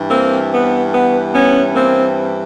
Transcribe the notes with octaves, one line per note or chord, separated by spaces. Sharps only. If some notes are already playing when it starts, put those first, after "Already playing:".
Already playing: G2 E3
A#3 C4
B3
B3
B3 C#4
A#3 C4